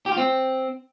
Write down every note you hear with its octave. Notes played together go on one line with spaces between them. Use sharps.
G4
F4
C4